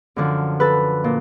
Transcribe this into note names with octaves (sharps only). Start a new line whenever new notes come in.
F#2 D3 F3
A4 B4
A#2